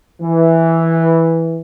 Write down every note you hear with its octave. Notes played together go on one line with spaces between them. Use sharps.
E3